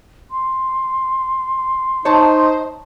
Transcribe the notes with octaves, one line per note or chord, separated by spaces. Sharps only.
C6
D#4 C5 C#5 D#5 A5